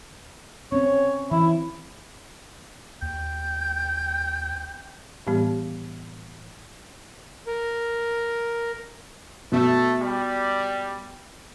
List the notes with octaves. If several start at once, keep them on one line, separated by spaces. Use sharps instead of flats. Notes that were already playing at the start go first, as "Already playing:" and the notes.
C4 C#4 C#5
E3 E4
D#2 G5
A2 E3 G3 B3 G4
A#4
B2 A3
G3